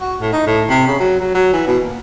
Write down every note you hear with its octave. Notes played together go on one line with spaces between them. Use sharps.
F#4
A2
D#4
A2
C3
C#3
F#3
F#3
F#3
E3
B2
A#3